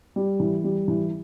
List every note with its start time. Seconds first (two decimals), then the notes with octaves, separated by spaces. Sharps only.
0.16 G3
0.40 E3
0.64 G3
0.88 E3